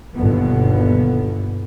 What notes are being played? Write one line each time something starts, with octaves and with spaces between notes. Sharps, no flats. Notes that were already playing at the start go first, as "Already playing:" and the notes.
G1 D#2 B2 D3 B3